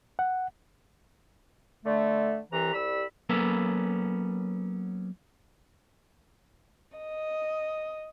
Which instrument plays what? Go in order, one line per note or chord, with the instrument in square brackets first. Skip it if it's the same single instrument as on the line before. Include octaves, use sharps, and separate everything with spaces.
[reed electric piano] F#5
[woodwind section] D3 A3
C2 C3 E3 A#5
C2 G3 B5 E6
[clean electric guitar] F#3 A#3 B3 C#4 A4 B4
[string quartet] D#5